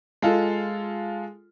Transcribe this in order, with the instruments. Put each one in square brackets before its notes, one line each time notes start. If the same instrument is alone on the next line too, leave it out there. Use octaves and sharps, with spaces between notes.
[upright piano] G#3 F4 A4